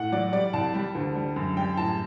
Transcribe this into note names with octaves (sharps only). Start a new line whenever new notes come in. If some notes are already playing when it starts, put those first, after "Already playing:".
Already playing: A2 F#5
F#3 D5
G3 D5
C2 A5
G3
D2
G3
F#2
G3 G5
A2 A5